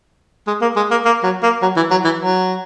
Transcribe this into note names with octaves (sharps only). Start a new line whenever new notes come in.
G#3
A#3
G#3
A#3
A#3
F#3
A#3
F#3
E3
F#3
E3
F#3